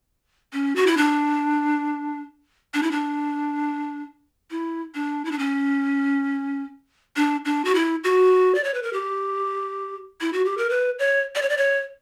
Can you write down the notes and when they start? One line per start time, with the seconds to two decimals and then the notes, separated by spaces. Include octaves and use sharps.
0.53 C#4
0.76 F#4
0.87 E4
0.97 D4
2.74 D4
2.83 E4
2.91 D4
4.51 E4
4.95 D4
5.25 E4
5.31 D4
5.39 C#4
7.16 D4
7.45 D4
7.65 F#4
7.75 E4
8.04 F#4
8.55 D5
8.64 C#5
8.74 B4
8.83 A#4
8.93 G4
10.21 E4
10.33 F#4
10.45 G4
10.58 A#4
10.70 B4
10.99 C#5
11.35 D5
11.42 C#5
11.49 D5
11.57 C#5